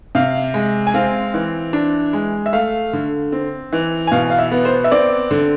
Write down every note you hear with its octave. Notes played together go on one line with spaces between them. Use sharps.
C3 F5
G#3
G#5
C4 F5
E3
D4
G#3
E5
A3 F5
D3
C4
E3
G#5
B2 F5
F5
E5
B3
C5
E5
C4 D5
D3